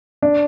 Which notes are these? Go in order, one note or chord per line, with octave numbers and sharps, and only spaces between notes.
D4